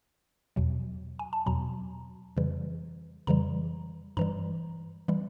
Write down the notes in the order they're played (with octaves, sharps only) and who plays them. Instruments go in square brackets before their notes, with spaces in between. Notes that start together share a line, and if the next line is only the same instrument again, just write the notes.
[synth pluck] E2 B2 F#3
G#5
A5
E2 B2 F#3 A#5
F2 C#3 E3 G3
F2 C#3 E3 G3 A#5
G2 E3 G3 A#5
E3 G3